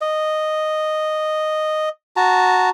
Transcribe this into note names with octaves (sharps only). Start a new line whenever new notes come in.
D#5
F#4 A5 A#5